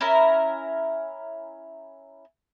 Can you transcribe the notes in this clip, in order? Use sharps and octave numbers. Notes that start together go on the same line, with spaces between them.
C#4 E4 A#4